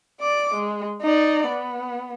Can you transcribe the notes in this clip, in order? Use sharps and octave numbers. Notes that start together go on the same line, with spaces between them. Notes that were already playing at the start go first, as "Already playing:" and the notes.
D5 D6
G#3
D#4 D5
B3